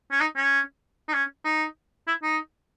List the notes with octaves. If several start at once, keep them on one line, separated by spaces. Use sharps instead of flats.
C#4
D#4
C#4
D#4
C#4
D#4
E4
D#4